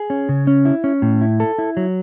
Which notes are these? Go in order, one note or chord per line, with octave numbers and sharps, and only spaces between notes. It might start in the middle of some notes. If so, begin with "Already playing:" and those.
Already playing: G#4
C#4
C#3
C#4
E4
C#4
A2
E4
A4
E4
F#3